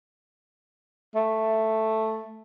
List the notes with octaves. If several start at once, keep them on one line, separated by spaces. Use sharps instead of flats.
A3